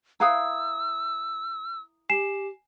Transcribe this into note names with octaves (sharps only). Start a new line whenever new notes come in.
E4 B4 F5 A#5 D#6 E6
G4 G#5 C7 E7